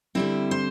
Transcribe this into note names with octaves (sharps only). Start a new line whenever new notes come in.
D3 G3 C4 E4
C5